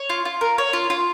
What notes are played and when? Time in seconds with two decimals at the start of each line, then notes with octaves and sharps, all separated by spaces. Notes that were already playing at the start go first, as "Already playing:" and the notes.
Already playing: C#5
0.10 F4
0.25 F4
0.41 A#4
0.58 C#5
0.73 F4
0.90 F4